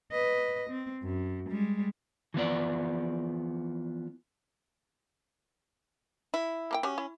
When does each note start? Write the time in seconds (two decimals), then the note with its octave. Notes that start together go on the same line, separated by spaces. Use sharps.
0.12 B4 D#5
0.70 C4
1.03 F#2
1.49 G3 G#3
2.34 E3 F3 B3 D5
6.34 E4
6.71 A#3 A#4 G5
6.83 C#4 F#4 G4
6.98 E4